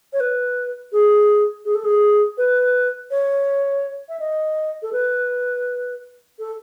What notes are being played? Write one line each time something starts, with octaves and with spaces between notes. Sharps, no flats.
C#5
B4
G#4
G#4
A4
G#4
B4
C#5
E5
D#5
A4
B4
A4